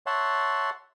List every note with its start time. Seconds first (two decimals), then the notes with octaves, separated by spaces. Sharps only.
0.06 C#5 E5 F#5 A5 C6